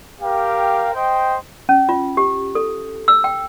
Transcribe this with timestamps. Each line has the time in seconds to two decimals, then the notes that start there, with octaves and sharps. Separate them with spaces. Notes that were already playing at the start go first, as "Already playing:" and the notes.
0.21 G4 A#4 F5 G5
0.94 C5 D#5 G5
1.69 C#4
1.89 F4
2.17 G4
2.55 A4
3.08 E6
3.24 G5